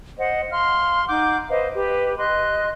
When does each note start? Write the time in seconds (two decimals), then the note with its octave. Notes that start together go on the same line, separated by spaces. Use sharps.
0.19 C5 D#5 F#5
0.50 F5 C6 F6
1.09 D#4 F#5 D6 G6
1.49 B4 C5 D#5 F5
1.75 G4 B4
2.18 D#5 C6 F#6